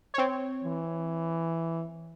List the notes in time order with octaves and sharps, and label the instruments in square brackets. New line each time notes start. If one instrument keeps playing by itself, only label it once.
[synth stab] C4 C#5
[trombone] E3